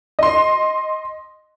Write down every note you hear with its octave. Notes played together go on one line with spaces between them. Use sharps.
D#5 C6